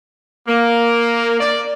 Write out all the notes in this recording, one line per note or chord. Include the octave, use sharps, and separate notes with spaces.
A#3
D5